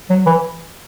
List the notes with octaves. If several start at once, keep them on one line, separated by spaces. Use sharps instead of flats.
F#3
E3